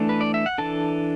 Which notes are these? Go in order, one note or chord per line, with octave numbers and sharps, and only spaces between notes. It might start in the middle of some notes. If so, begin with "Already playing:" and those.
Already playing: E3 A3 D4
B4
D5
E5
F#5
E3 D4 A4 A5